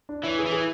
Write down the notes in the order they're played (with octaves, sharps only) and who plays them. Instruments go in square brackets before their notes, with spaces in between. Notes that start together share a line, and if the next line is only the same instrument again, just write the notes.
[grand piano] D4
[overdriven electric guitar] E3 [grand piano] C#5
[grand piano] G#4
[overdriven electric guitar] E3
[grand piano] G#4